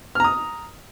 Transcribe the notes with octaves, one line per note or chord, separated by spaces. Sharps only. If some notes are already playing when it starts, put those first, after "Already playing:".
A#5 D#6 F6